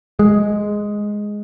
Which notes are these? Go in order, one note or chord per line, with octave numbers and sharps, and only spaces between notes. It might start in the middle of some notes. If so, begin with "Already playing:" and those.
G#3